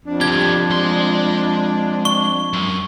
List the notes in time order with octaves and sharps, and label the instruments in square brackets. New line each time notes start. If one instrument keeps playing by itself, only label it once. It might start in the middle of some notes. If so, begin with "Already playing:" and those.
[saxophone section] F2 D4
[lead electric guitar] C2 G4 [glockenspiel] G#6
[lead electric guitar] G#3 C6
[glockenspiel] C#6 G7
[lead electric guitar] F#2